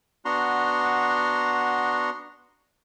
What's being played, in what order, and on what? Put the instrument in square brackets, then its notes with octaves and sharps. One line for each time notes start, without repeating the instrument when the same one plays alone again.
[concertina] B3 D4 F#4 A#5 C6